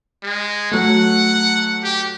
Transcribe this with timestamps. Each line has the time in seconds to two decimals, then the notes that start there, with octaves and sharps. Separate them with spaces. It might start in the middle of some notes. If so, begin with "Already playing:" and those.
0.23 G#3
0.72 F#3 A3 F#5
1.83 G4